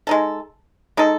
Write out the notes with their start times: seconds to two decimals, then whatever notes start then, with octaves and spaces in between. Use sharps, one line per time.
0.07 G#3 D#4 A4
0.97 G#3 D#4 A4